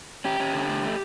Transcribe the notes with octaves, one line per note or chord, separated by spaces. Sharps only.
C#4 G4
C#4
D3
A3
A3